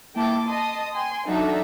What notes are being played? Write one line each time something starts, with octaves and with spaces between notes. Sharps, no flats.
A#3 E4 G5 A5 D6
D#5 A5 C6 D#6
G5 G#5 C6
F#3 D4 D#4 F#4 A4 E5